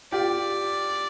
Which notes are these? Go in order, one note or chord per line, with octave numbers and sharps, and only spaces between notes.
F4 G4 D5